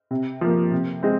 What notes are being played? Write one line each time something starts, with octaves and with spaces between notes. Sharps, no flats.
C3
F3 A#3
C3
G#3 C4